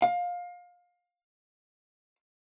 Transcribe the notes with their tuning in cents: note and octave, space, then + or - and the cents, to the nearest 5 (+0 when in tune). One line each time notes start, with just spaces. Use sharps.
F5 +25